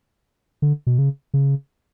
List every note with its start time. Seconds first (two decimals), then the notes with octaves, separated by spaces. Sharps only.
0.62 D3
0.87 B2
0.98 C#3
1.34 C#3